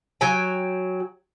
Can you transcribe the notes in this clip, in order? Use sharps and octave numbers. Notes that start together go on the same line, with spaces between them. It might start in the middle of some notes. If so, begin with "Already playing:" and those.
F#3 G5 G#5